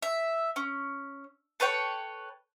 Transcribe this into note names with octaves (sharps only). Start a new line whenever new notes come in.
E5
C#4
A4 B4 C#5 G5